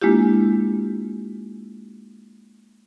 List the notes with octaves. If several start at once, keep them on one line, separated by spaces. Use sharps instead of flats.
G#3 A#3 D4 E4 F4 G4